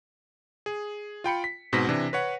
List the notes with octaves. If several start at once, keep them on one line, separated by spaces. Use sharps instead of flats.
G#4
F4 G5 B5 C#7
B6
G#2 B2 C4 A#6 B6
C3 E3 D4
B4 C#5 F#5